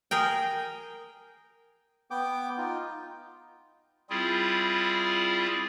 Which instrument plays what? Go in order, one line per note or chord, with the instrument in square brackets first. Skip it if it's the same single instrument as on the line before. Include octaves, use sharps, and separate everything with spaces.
[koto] G#4 A#4 G5
[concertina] B3 G5 D6
D#4 F4
[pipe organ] G3 C4 E4 F4 G#4